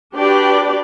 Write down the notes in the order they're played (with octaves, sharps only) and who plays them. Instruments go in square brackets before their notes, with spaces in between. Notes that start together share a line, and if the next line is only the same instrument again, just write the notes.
[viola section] D4 F#4 G4 B4 D5 G5